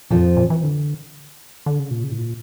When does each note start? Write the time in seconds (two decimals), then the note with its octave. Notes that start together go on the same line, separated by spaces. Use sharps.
0.10 F2 A#2 F3
0.37 A#2
0.50 E3
0.63 D3
1.66 D3
1.79 C#3
1.91 A#2
2.04 C#3
2.12 A2
2.18 A#2